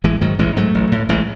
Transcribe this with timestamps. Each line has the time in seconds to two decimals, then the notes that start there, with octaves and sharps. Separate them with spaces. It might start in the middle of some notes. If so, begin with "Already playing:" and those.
0.04 A1 E3 G#3
0.21 G#2 D#3 F#3
0.39 A1 E3 G#3
0.57 G#2 F#3 A3
0.75 A1
0.92 A2
1.09 A1 E3 G#3